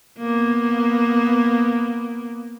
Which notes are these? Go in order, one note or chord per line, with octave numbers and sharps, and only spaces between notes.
A#3 B3